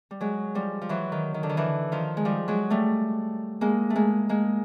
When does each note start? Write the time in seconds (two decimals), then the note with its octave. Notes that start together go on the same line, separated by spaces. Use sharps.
0.11 G3
0.21 F#3 G#3
0.55 F3 G3
0.82 F3
0.89 E3 F#3
1.12 D#3
1.34 D#3
1.43 D3
1.49 D#3
1.57 D3 E3
1.92 D#3 F3
2.17 G#3
2.25 F3 G3
2.48 F#3 G#3
2.70 G3 A3
3.61 G#3 A#3
3.90 A3
3.96 G#3 A#3
4.29 G#3 A#3